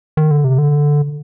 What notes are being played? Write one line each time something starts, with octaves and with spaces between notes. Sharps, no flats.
D#3
D3
C3
D3